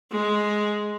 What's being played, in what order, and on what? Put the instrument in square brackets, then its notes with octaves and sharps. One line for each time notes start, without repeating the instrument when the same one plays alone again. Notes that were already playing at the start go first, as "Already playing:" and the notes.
[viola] G#3